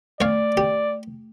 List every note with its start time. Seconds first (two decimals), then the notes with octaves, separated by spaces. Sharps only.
0.21 A3 C#5 D5 F5
0.57 G4